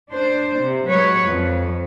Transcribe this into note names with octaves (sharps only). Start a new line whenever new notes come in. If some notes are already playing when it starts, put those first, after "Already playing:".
D4 C5
C3
F#3 G#3 B4 C#5
F2